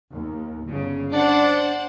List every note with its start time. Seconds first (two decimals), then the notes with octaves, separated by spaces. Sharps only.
0.13 D#2
0.66 G1 C#3
1.13 D4 C5 D5 F#5